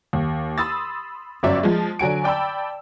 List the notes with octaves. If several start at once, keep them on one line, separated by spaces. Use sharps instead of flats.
D#2
B5 C6 D#6 E6 A6
G1 F#3 C#4 D5 E5
F3 G#3
D3 F#3 G#5 D7
D5 G5 A5 B5 E6